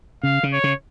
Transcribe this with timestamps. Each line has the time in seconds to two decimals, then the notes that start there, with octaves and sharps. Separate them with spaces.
0.23 C#3 F5
0.43 C#3
0.53 C#5
0.64 C#3